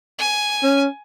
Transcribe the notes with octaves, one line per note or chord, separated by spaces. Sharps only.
G#5
C#4